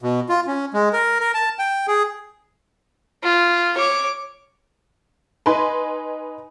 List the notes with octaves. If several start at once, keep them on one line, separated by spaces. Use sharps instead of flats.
B2
F4
C#4
G#3
A#4
A#4
A5
G5
G#4
F4
C#5 D6
D#4 B4 G#5 B5 C6